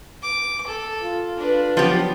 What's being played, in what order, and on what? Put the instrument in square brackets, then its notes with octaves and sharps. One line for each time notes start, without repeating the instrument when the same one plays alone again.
[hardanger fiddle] D6
A4
[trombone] F4
[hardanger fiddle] D4 B4
[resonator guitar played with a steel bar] F3 B3 G4 [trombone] F#3